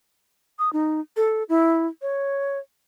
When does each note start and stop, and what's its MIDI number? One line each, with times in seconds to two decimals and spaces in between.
0.59 0.72 87
0.73 1.00 63
1.17 1.43 69
1.49 1.88 64
2.02 2.59 73